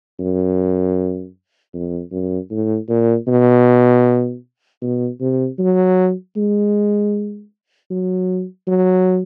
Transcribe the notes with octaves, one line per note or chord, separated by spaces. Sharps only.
F#2
F2
F#2
A2
A#2
B2
B2
C3
F#3
G#3
F#3
F#3